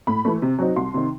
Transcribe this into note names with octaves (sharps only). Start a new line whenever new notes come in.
A2 B5
E3 A3
C3
F#3 C4 D#4
C2 C6
C3 D#3